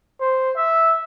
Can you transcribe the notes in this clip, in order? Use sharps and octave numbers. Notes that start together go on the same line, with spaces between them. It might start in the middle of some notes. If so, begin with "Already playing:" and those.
C5
E5